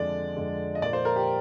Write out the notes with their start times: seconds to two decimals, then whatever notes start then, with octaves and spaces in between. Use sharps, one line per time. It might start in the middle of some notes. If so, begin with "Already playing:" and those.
Already playing: F2 D3 G#3 D5
0.36 F2 D3 G#3
0.75 D#5
0.82 A#2 F3 A#3 D5
0.93 C5
1.05 A#4
1.16 G4